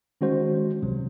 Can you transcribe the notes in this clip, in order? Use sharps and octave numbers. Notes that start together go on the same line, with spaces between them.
D#3 G#3 C#4 F#4 C5
C#2 C3 F#3